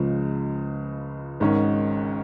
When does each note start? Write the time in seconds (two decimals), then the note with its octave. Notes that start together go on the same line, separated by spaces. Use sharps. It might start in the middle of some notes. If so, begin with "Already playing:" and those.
Already playing: C#2 C#3 F3 G#3
1.40 G#1 G#2 D#3 G#3 C#4